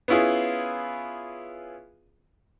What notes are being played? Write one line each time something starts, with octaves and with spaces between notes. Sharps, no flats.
B3 C#4 E4 F4 G#4